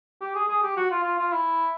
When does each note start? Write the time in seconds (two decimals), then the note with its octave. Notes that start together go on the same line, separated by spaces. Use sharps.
0.21 G4
0.35 G#4
0.48 G#4
0.62 G4
0.77 F#4
0.91 F4
1.04 F4
1.19 F4
1.32 E4